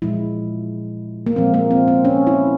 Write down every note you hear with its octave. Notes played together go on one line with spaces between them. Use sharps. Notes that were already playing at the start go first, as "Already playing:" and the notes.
A#2 F3 G#3 E4
A#3
A#2 F3 G#3 C4
A#3
C4
C4
C#4
E4